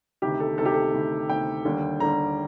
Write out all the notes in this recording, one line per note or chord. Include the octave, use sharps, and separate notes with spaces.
D2 C3 D#3 G4
A4
D2 C3 D#3 A4
G4
A4
D2 C3 D#3
D2 C3 D#3 G5
D#2 D3 G3
D#2 D3 G3 A#5